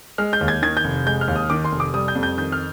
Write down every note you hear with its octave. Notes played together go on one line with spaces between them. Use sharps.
G#3 F6
G6
D#2
G#6
D#3 G#6
G6
F1
G#3 G6
F6
D#2
D#6
D#3 D6
C6
F1
D6
G3 D#6
G6
F2
G6
D#3 G6
F6